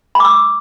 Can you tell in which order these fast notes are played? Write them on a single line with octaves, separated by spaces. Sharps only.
B5 D6 E6